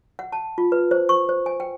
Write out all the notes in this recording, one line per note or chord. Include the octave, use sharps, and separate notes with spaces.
F#5
A5
F4
B4
C5
C#6
C5
G#5
G5